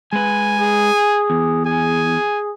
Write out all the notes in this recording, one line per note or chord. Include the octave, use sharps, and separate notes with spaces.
G#3 B4 G#5
G#4
E2
G#4 G#5